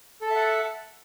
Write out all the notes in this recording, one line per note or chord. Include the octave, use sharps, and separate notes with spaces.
A4 E5 F#5 A5